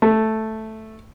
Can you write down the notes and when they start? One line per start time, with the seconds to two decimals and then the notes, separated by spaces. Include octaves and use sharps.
0.02 A3